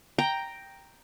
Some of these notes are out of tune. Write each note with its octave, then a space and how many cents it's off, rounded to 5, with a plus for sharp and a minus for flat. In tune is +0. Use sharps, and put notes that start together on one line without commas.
G5 +0 A#5 +0